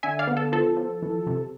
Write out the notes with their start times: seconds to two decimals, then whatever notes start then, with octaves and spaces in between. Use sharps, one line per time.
0.03 D3 E5 G#5
0.19 D5 F5
0.27 B3
0.37 A4
0.52 F3 A4
0.77 F3
1.02 E3
1.27 C3